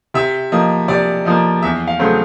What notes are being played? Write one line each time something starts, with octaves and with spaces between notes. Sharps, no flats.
C3 E5
F3 A#3 D#5
C3 D5
F3 A#3 D#5
E2 E5
F5
C#3 F#3 A3 C4